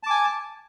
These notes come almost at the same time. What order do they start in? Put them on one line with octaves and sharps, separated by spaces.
A5 D6 G#5